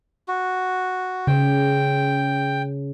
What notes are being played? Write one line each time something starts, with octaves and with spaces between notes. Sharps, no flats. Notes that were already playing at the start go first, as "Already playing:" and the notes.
F#4
C#3 G5